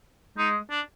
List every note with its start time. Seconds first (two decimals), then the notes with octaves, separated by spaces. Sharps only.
0.38 G#3 D#4
0.70 D4